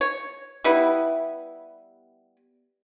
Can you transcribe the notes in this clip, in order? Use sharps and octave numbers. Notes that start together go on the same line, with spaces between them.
C#5
G3 B3 E4